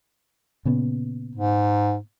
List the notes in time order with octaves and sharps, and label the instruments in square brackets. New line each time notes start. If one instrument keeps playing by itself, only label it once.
[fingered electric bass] A#2 C#3 B3
[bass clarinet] G#2